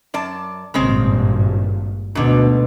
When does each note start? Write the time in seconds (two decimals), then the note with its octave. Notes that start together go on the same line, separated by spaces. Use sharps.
0.14 F#2 D5 A5
0.74 G#1 G2 A#2 C#3 G#3 C4
2.15 D2 G#2 B2 D3